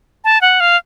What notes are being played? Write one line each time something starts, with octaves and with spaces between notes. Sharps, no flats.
A5
F#5
F5